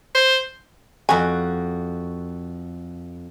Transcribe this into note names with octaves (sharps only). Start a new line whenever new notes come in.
C5
F2 F#4 G#5